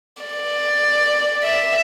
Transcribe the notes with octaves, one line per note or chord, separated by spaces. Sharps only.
D5
E5